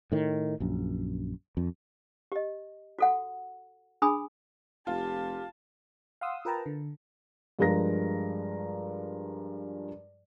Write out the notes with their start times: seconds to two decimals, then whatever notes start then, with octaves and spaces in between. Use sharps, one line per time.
0.12 A2 D#3
0.60 A#1 F#2
1.57 F2
2.32 G4 D#5
2.99 F#4 A4 F#5
4.02 D4 G#4 G#5 B5 D#6
4.87 F1 F4 G4 A5
6.21 F5 F#5 C6 D#6 E6
6.45 F4 A#4 B4 G5 A5 A#5
6.66 D3
7.59 G2 F3 G#3 A#4 A#5 A#6